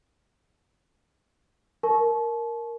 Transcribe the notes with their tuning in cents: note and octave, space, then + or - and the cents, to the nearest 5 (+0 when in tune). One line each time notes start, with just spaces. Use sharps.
A#4 +0 A5 -35 C#6 -10